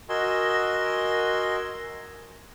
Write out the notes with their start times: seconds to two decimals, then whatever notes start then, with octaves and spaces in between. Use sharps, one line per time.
0.09 F#4 A#4 D#5 G#5 C6 E6